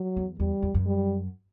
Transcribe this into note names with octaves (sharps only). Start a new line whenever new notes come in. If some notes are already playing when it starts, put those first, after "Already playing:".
Already playing: F#3
E2
E2 G3
E2
F#2
G3